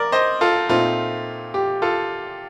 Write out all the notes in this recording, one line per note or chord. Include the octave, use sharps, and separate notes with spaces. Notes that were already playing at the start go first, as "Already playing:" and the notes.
Already playing: A#4 D5
C5 D#5
F4 A4
A#2 A3 C4 D#4 F4
G4
F4 A4